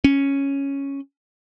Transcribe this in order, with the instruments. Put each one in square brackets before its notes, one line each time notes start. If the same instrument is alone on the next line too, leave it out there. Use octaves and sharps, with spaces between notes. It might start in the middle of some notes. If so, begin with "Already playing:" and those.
[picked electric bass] C#4